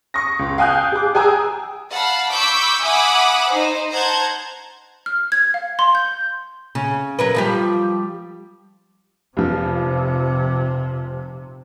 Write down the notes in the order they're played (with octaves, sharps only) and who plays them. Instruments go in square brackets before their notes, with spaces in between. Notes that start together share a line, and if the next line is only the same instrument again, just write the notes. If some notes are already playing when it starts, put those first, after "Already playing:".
[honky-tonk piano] C#6 D#6 A#6
C#2
F5 G5 G#5 D#6 F#6 G6
G#4 D6
G#4 G5 G#5 A#5 D#6 E6
[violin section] F5 F#5 A5 B5
B5 C#6 D6 E6 G6 B6
E5 F#5 G#5 B5 D6 D#6
D#4 C5
C5 F#5 A5 A#5 G6 G#6
[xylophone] F6
G#6
F5
C6
G6
[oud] C#3
F#3 A#4 B4
F3 G3 G4
[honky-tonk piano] F1 F3 [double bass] C3